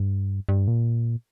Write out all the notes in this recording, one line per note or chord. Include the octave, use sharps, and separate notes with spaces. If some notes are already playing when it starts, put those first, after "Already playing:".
Already playing: G2
G2
A#2